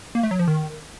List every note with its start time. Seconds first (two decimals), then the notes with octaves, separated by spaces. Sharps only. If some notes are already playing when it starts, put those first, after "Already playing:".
0.15 A#3
0.23 A3
0.31 F#3
0.39 F3
0.48 D#3